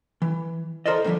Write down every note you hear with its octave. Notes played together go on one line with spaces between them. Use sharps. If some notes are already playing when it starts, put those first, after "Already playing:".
E3
A4 A#4 C5 D5 D#5
A2 D3 E3 F3 G3